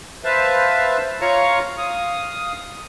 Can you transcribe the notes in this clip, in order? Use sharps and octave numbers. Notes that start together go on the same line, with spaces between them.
B4 C5 E5 F5 A5
F4 C#5 F5 A#5 C#6
F5 D#6